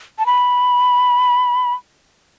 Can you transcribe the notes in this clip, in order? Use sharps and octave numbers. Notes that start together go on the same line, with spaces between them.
A5
B5